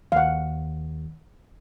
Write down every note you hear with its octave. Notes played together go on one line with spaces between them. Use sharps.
D#2 F5 F#5